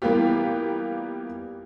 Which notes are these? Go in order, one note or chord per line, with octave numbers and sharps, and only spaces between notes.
E3 G3 A#3 B3 F4 G4